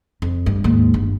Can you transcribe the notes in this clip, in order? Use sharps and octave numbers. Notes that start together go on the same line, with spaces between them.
F2
G2
D#2 G#2
G1